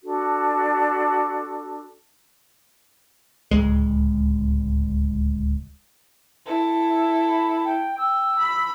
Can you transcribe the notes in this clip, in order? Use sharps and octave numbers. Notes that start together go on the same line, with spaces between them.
D4 F#4 A4
D1 G#1 C#2 G#3
E4 A4
E5
B5
G5
G5 E6
B5